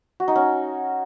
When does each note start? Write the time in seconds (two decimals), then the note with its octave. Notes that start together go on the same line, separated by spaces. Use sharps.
0.20 F#4
0.28 D#4
0.36 C#4